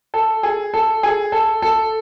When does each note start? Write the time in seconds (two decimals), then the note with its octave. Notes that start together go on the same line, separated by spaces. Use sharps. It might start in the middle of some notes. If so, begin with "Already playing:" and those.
0.14 A4
0.43 G#4
0.74 A4
1.03 G#4
1.32 A4
1.62 A4